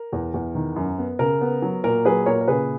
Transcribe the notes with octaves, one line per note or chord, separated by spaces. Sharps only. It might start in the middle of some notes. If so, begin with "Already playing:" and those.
Already playing: A#4
E2
E2
D#3
F#2
B3
C#3 A#4
B3
F#3
A#2 A#4
F#3 G#4 B4
A#2 A#4 C#5
A#4
C#3 G#4 B4